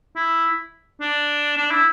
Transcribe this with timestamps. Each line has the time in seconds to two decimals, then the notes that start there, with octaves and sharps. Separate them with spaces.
0.16 E4
1.01 D4
1.57 D4
1.71 E4